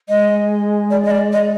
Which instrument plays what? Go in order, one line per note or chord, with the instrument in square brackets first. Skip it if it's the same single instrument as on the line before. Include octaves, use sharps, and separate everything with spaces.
[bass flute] G#3 [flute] D#5
[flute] D5
D#5
D5
D#5